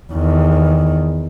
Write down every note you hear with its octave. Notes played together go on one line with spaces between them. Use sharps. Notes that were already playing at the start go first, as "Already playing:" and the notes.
E2 D#3